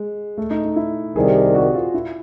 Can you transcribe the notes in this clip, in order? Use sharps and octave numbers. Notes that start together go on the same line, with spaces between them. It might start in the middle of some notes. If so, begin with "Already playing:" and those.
Already playing: G#3
A3
D#4
D#4
E4
C2 C3 D#3 G3 G#4
F#4
F4
E4